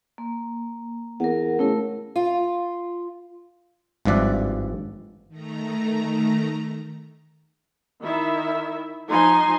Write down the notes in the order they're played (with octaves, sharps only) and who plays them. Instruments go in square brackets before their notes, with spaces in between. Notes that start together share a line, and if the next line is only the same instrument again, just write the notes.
[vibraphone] A#3
[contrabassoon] E2 [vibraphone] A#4 F#5
[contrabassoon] C#3 [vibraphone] A3 E4 A#4
[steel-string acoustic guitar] F4
[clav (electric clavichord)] G#1 G2 F3 D5 E5 F#5
[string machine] D#3 A3 A#5
[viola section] D#3 E4 E5
F3 D#4 G#5 A#5 C6